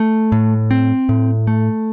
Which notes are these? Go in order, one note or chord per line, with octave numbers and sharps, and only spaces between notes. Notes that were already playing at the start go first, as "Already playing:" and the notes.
Already playing: A3
A2
C4
A2
A3